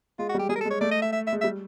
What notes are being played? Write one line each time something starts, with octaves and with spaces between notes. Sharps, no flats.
G#3 F4
F#4
G3 G4
G3 G#4
A#4
G#3 A4
C#5
A3 D5
D#5
E5
E5
E5
G#3
E5
G3